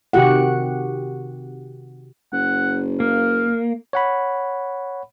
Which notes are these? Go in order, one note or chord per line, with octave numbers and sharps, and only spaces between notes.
C3 D#3 F#4 G4 F#5
F#1 F#5
A#3 F5
C#5 F#5 B5